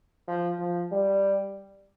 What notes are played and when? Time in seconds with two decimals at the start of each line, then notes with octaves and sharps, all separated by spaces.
0.28 F3
0.59 F3
0.92 G3